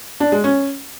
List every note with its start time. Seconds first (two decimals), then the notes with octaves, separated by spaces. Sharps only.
0.20 D4
0.32 G#3
0.44 C#4